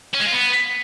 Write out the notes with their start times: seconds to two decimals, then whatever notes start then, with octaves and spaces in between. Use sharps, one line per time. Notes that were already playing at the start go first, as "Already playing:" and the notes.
0.14 C#4
0.20 G#3
0.26 F4
0.32 B3